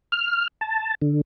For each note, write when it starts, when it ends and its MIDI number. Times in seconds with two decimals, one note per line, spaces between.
0.12 0.48 89
0.61 0.95 81
1.02 1.21 50